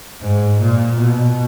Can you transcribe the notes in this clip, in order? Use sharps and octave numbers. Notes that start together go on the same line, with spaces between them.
G#2
A#2
B2